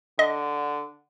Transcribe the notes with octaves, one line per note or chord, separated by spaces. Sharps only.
D3 D#5